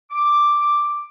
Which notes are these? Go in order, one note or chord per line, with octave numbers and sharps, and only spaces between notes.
D6